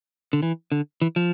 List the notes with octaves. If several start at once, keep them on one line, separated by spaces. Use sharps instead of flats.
D3
E3
D3
E3
F3